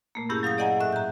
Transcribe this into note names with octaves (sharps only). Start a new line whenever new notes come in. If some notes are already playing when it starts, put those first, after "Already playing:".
A#2 A3 A#3
G2 C#4 E4 G4 G#4 G6
F#3 F5 D#6 A#6
G#4 D5 D#5 F#5 G#5 A#5
A2 E5 F#6
A#5 G6